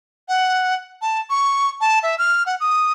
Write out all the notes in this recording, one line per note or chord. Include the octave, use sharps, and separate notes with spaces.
F#5
A5
C#6
A5
E5
F6
F#5
D#6